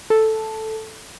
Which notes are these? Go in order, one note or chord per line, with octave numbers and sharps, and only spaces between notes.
A4